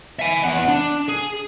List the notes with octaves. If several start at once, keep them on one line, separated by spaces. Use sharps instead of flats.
E5 G#5
E2 F#5
D4
G#4